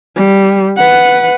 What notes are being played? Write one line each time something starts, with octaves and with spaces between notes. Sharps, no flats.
G3
B4 F#5